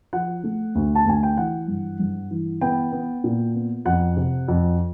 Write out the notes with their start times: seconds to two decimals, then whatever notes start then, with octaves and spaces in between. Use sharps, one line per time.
0.13 F3 F#5
0.44 A3
0.75 D2
0.95 A5
1.06 D2 G#5
1.23 G5
1.37 E3 F#5
1.68 G2
1.99 G2
2.31 E3
2.61 B3 G5
2.92 B3
3.24 A#2
3.55 B3
3.85 F2 F#5
4.17 C3
4.48 F2